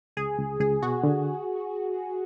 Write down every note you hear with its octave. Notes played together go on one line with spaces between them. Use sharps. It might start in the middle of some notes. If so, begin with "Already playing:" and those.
C#2 G#4
C#2
C#2 G#4
B2 F#4
D3